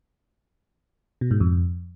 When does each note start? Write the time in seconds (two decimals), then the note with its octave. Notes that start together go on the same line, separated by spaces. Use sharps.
1.21 B2
1.31 G#2
1.40 F2